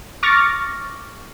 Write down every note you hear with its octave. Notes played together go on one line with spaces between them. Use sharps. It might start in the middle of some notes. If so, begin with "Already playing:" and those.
C#6 D6 F6 A6 A#6